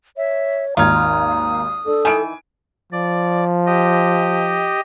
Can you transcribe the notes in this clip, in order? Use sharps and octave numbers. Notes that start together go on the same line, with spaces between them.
C#5 E5
G#1 D#2 D#4 F4 A#5 D#6 G#6
D4 A4
D#3 E3 G#5 D7
F3 D5
G4 D#5